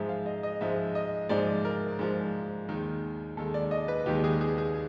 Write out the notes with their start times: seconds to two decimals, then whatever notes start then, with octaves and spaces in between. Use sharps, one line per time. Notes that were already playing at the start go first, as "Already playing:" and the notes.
Already playing: G#2 F3 G#3 E5
0.09 F5
0.26 D#5
0.43 D#5
0.61 G#2 F3 G#3 E5
0.95 D#5
1.29 G#2 F3 G#3 D5
1.65 A#4
1.99 G#2 F3 G#3
2.69 D#2 D#3 G#3
3.37 D#2 D#3 G#3 A4
3.54 D5
3.71 D#5
3.88 B4
4.06 D#2 D#3 G#3 G4
4.24 G#4
4.41 G#4
4.58 G#4